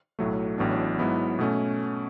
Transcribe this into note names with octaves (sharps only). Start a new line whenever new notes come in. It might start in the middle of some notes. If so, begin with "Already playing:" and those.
B1 A2 F#3 A3
A1 A2 F#3 B3 D4
G#2 F#3 B3 E4
B2 A3 C#4